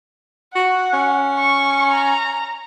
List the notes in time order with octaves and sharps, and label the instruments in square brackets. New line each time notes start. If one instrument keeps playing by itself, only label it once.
[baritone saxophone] F#4 [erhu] F#5
[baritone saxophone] C#4
[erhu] C#6
A#5